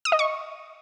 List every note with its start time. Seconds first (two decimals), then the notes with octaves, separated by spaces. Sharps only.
0.05 D#6
0.12 D#5
0.19 C#6